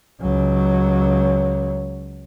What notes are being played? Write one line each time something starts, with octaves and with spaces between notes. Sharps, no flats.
C#2 F#3